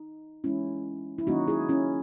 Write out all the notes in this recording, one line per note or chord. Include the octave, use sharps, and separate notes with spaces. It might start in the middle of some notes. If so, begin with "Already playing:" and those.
Already playing: D#4
E3 G#3 C#4 E4
E4
D#3 F#3 A#3 C#4 D#4 F#4
E4 G#4
C#4 E4